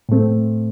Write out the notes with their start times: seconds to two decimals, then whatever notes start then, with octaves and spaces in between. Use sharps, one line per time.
0.09 A2 A3 C4